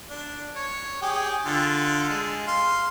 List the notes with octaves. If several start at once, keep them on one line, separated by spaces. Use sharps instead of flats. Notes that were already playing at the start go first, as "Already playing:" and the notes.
D4
C#5
G4 G#4
D3 F4
G#3
F5 C6